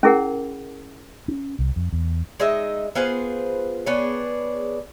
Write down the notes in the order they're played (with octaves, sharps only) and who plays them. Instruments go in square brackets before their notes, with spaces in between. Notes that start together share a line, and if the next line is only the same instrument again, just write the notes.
[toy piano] C#4 E4 G#4 A#4 F#5
[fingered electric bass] C#4
C2
F2
E2
[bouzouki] G#3 D#4 D#5 E5
B3 F4 G#4 C5
B3 D4 G#4 C#5